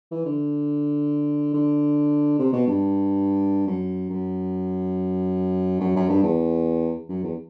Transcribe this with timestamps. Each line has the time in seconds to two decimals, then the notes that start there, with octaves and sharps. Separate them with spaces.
0.11 E3
0.26 D3
1.54 D3
2.39 C3
2.53 B2
2.67 G2
3.67 F#2
4.10 F#2
5.81 F#2
5.96 F#2
6.09 G2
6.23 E2
7.09 F#2
7.23 E2